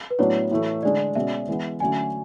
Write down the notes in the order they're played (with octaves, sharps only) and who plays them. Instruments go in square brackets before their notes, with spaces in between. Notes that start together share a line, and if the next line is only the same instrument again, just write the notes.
[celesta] B4
[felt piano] A2 F#3 B3 D4 [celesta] C#5
[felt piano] A2 E3 A3
[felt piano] D3 G#3 D4 [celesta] D5
[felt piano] B2 G#3 C#4 [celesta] E5
[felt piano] E3 G#3 B3
[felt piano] D3 F#3 A3 C#4 [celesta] G#5